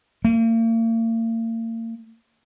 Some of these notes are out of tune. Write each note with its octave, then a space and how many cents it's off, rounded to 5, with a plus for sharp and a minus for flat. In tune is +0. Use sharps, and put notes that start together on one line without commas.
A#3 -40